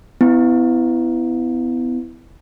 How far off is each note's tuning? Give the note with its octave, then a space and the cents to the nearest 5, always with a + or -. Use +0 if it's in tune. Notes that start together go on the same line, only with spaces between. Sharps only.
B3 +30 E4 +0